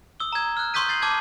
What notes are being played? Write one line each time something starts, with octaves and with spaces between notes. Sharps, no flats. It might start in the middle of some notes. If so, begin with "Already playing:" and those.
D#6 E6 G7
A#5 G#6
F6 F#6
C6 C#6 D#6 G6 B6 D#7
A6 C7 F#7
A5 D6 F6 G#6